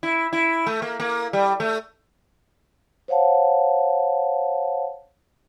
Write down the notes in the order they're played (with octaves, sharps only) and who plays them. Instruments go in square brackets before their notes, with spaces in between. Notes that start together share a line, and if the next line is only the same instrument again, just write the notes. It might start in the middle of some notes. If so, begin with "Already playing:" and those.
[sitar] E4
E4
A3
A#3
A#3
G3
A3
[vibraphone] C5 C#5 F5 F#5 A5